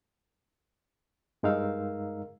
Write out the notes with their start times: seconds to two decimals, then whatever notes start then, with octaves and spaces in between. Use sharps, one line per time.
1.43 G2 G#3 D#4 A#4 F5 E6